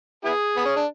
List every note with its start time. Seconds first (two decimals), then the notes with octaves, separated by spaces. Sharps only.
0.25 B3 E4 G#4
0.57 B3
0.66 C#4
0.76 D4